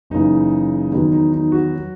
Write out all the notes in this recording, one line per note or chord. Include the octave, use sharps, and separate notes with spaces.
F#1 F#2 C#3 E3 D#4
E2 D#3 F#3 D#4
D#4
D#4
F#4
F#3